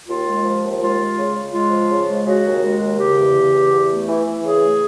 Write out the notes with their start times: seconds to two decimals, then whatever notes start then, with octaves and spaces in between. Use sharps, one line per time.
0.07 D#2 F4
0.26 G#3
0.44 F3
0.62 D#2
0.80 G#3 F4
0.99 G#3
1.17 C#3
1.35 C#3
1.53 G#3 F4
1.71 F3
1.89 C#3
2.08 G#3
2.25 C#3 F#4
2.44 D#2
2.62 G#3
2.80 D#2
2.98 C#3 G4
3.17 E2
3.34 C#3
3.54 E2
3.71 E2
3.89 A3
4.08 E3
4.26 E3
4.43 C#3 G#4
4.62 A3